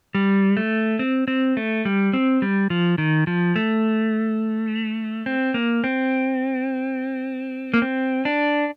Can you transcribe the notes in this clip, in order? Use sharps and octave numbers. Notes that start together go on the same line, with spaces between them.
G3
A3
C4
C4
A3
G3
C4
G3
F3
D#3
F3
A3
C4
A#3
C4
A#3
C4
D4